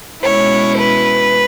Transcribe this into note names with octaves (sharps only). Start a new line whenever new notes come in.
B2 G#3 C#4 E4 C#5
B4